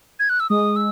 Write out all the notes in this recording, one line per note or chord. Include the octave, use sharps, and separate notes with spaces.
G#6
F#6
E6
G#3 D#6
E6